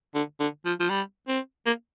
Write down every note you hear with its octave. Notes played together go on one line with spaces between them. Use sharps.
D3
D3
F3
F3
G3
C4
A#3